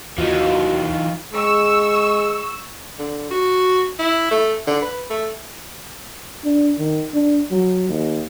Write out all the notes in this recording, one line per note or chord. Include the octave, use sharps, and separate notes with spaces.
D#2 E3 D#4 F4 F#4
G#3 C#6 E6
D3
F#4
E4
A3
D3
B4
A3
D4
D#3
D4
F#3
D#2